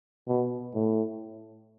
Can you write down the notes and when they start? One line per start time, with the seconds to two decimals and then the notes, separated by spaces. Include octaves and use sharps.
0.28 B2
0.75 A2